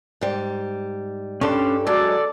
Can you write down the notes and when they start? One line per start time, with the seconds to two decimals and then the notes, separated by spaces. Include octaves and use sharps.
0.21 G#2 G3
1.41 G2 G3 C#4 D4 A4 C6
1.87 F#3 G#3 A4 D5